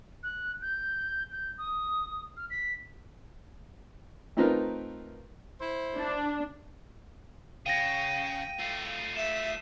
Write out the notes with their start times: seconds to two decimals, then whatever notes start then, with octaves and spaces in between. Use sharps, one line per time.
0.23 F#6
0.62 G6
1.32 G6
1.58 D#6
2.37 F6
2.50 B6
4.37 A3 C4 D#4 F4 A#4 B4
5.60 E4 C5
5.98 D4
7.66 C#3 F5 G5 A#6 D#7
8.59 A3 F4
9.16 E5 E7